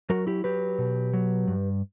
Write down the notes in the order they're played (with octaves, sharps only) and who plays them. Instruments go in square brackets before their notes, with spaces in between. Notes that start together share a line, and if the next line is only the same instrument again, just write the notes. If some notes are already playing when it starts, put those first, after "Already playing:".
[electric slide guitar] F#3 F#4 A#4
E4 G4
F#3 G4 B4
B2
F#3
G2